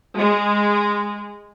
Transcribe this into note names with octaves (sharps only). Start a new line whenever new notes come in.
G#3